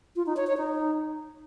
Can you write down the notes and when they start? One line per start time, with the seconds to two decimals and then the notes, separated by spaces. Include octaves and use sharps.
0.16 F4
0.26 D#4
0.37 C#5
0.47 C#5
0.57 D#4